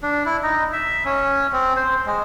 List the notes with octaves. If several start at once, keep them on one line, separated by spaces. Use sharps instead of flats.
D4
E4
D#4
E5
C#4
C4
C5
G#3